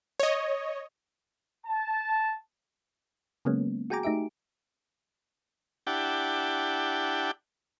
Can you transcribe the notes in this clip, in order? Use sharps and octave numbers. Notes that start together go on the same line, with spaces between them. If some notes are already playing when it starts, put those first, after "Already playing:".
C#5 D#5
A5
C#3 F#3 G#3 A#3 B3 C#4
F#4 G#4 G5 G#5 A#5 D6
A3 D#4 G4 E5 D7
D4 E4 G4 F#5 G5 A5